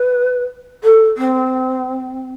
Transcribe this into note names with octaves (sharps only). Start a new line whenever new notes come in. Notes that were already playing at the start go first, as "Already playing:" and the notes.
Already playing: B4
A4
C4